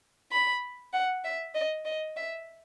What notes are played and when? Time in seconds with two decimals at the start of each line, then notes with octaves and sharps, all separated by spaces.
0.32 B5
0.93 F#5
1.24 E5
1.55 D#5
1.85 D#5
2.17 E5